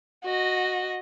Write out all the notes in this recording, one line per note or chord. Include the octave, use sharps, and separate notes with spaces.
F#4 D#5